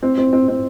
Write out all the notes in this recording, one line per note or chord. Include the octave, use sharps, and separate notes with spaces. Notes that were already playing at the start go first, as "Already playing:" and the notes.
C4
C4
C4
C4